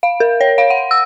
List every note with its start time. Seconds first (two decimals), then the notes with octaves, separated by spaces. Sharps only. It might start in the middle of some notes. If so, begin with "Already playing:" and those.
0.03 F5
0.20 A#4
0.41 C#5
0.58 F5
0.70 F#5
0.91 E6